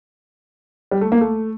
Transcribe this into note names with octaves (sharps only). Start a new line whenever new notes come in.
G3
A3
A#3
A3